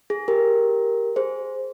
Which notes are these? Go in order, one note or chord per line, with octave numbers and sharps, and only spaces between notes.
G#4
G4 A#4
G#4 C5